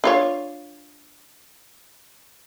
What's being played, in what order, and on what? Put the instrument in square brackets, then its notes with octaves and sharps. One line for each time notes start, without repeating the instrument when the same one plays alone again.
[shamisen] D4 F4 C#5